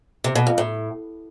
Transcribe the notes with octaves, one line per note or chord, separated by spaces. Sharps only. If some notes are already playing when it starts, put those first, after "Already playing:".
C3
B2
F2
A2